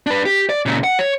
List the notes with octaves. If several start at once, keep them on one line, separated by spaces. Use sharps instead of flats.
D4 B4
G4
D5
A#2 C#3
F#5
C#5